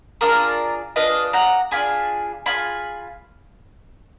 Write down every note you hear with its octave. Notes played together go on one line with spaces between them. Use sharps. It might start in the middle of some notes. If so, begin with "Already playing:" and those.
D4 F4 G#4 A#4 D5
D4 F4 G#4 B4 D#5
F#5 A#5
D4 F4 G#4 G#5 B5
D4 F4 G#4 G#5 B5